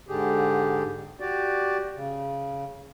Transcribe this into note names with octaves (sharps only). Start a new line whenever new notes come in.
G#2 D3 G4 G#4
F#4 G4 D5
C#3